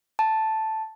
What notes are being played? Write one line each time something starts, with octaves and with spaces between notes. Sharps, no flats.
A5